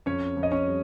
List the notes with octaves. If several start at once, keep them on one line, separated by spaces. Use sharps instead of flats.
F2 C#4 C#5
F2
D#5
C#4 C#5
G3